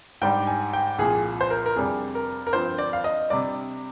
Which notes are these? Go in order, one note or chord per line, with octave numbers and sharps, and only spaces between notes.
G#2 G3 D4 G5
G#5
G5
C2 A#2 F3 G#4
C5
A#4
A#4
F2 C3 G3 D4 G#4
A#4
A#4
G2 F3 C4 C5
D5
F5
D#5
C3 G3 D4 D5